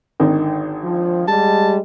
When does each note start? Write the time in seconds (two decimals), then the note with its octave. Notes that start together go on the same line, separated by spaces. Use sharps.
0.20 G#1 D3 D#3
0.83 F3
1.28 G3 G#3 A5